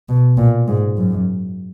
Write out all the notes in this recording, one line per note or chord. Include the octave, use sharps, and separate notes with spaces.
B2
A#2
G#2
F#2